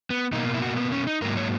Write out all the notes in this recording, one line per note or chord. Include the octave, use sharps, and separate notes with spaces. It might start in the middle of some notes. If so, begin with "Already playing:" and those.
B3
B2 A#3 D#4
E4
F#4
B3
C#4
D#4
G#2 F#3 A#3 A#4
C#5